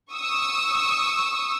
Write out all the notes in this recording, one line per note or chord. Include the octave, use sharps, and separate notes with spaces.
C#6 D#6 E6